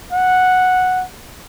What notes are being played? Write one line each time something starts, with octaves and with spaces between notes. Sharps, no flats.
F#5